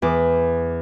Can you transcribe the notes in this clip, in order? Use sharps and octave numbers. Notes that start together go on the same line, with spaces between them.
E2 D6